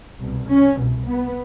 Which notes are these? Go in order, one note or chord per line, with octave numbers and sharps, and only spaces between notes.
C2 B2
C#4
C2 B2
B3